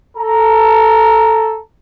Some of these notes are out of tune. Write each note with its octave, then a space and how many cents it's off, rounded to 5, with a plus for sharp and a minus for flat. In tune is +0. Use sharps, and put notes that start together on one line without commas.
A4 +0 A#5 +0